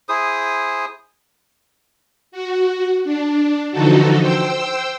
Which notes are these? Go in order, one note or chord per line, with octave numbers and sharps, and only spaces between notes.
E4 G#4 C5 D#6
F#4
D4
D3 E3 F3 D#4 F#4 A4
C5 G5 E6